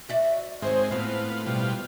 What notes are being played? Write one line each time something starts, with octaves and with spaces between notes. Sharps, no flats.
F#4 D5 E5
G#2 D#3 G#3 C4 C5 C#5
A2 B3 C4 F4
B2 G3 F4